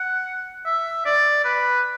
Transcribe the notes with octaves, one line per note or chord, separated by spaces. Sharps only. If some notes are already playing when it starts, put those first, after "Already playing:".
Already playing: F#5
E5
D5
B4